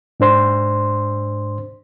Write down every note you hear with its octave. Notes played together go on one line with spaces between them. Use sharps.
G#2 D4 C5 C6